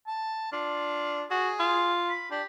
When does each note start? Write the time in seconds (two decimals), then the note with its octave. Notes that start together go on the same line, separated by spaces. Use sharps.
0.07 A5
0.52 D4 F4
1.31 F#4 G#4
1.60 F4
2.09 B5
2.31 D4 G4